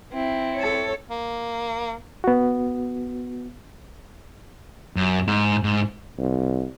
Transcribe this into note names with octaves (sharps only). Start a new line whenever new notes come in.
C4 E4
A4 C#5
A#3
B3 F#4
F#2
G#2
G#2
C2